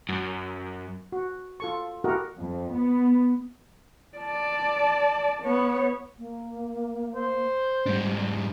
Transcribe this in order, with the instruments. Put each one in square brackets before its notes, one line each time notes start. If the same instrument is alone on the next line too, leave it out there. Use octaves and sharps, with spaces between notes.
[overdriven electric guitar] F#2
[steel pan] F#4
F4 A4 C#6
E4 F#4 G4 A4 A#4 D#5
[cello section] F2
B3
[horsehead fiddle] D5 A5
B3 C#5
[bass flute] A#3
[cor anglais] C5
[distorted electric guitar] G#2 D4 [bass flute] G3